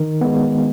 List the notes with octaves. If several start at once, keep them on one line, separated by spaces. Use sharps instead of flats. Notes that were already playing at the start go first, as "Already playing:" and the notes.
Already playing: D#3
G#3 B3